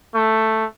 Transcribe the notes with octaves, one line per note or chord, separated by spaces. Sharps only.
A3